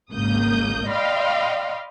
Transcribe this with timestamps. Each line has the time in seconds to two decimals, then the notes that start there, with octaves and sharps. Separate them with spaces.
0.12 G#1 C#2 A#3 D#6 G6
0.87 D5 D#5 F5 G5 B5 C6